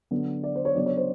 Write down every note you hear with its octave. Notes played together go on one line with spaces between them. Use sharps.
D3 F#3 B3
D5
C5
C#5
C#3 F#3 B3 D4 D5
C#5
C5